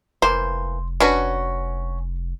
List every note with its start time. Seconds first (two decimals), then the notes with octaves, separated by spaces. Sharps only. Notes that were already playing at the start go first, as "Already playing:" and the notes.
0.22 F1 E3 A#3 C5
1.00 C#4 D4 F#4 B4 C#6